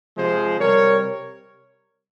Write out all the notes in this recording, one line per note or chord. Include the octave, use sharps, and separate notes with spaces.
C3 F3 G#3 G#4 C5
C3 G3 A#4 C#5